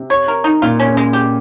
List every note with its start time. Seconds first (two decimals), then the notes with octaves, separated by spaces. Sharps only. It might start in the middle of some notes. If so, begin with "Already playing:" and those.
Already playing: C3
0.10 C#5
0.28 A#4
0.44 D#4
0.62 A#2 F4
0.79 C#4
0.88 C#3
0.97 G#3
1.13 G4